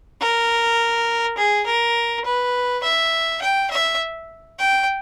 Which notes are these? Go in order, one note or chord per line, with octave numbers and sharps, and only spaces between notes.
A#4
G#4
A#4
B4
E5
G5
E5
G5